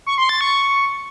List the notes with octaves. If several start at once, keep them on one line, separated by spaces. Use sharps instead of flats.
C#6
C6
A6
C#6